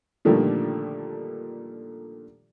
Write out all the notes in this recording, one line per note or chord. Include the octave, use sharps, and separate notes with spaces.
A#2 D3 D#3 F3 G3 A3